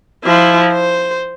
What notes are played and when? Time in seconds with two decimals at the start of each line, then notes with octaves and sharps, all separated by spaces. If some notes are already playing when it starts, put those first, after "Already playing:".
0.24 F3 E4
0.72 C5